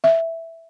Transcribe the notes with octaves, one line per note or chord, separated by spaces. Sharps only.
E5